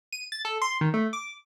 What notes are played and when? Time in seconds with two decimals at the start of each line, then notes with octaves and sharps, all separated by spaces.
0.13 D#7
0.32 A6
0.45 A4
0.62 C6
0.81 D#3
0.94 A3
1.13 D6